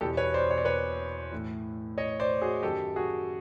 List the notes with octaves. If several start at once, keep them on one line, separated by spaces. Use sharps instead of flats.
E2 B2 G4 A4
B4 C#5
C5 D5
C#5
D5
B4 C#5
A2 E3
C#5 D#5
C5 D5
F#4 G#4
F#2 D#3 G4 A4
F#4 G#4